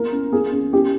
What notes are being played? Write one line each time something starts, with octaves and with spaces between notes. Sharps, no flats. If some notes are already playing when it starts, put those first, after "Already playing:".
Already playing: A#3 A#4
C#4
A#3 G#4
C#4
C#4 G4